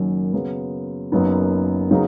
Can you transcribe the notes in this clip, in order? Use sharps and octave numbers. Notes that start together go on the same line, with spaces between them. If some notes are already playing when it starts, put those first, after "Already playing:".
Already playing: F#1 F#2 D#3 F#3
C#3 F#3 B3
F#1 F#2 F#3 B3 D#4
C#3 F#3 B3 D#4